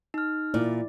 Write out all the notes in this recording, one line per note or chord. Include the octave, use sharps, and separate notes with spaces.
D#4 F6
A#2 E4 D5